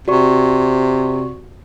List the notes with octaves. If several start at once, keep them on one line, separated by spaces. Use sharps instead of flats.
C3 F#4 D5 C#6